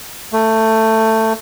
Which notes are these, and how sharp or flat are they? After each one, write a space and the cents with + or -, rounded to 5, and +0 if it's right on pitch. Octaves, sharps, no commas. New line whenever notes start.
A3 +15